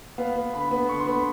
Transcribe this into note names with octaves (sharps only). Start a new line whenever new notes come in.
B3 F5
B3
D3 B5
B3
D3 C#6
C6
B3 B5